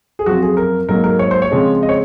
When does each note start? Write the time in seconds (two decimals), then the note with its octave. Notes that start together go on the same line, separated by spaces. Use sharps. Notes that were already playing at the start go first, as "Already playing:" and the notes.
0.19 G#4
0.26 F#2 F3 C4 F#4
0.42 G#4
0.57 A#4
0.89 G#2 F#3 A#3 A#4
1.04 A#4
1.19 C#5
1.31 C5
1.42 C#5
1.51 C#3 F3 G#3 C4
1.83 D#5
1.89 C#5